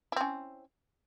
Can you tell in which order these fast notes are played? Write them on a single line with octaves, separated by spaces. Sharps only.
E4 C4 C#4